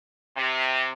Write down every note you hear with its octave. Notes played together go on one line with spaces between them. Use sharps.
C3